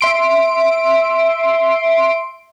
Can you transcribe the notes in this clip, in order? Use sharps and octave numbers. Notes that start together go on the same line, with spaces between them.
E5 C6 D7